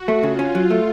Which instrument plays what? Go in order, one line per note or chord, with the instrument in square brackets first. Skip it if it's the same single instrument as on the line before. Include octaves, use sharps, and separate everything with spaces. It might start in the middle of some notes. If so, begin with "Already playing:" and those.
Already playing: [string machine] F#4
[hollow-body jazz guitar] A3
[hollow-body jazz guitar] C#3 [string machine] F4
[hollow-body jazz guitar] C#4
F#3
A3